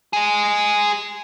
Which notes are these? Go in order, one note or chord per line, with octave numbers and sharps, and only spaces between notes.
G#3 G#4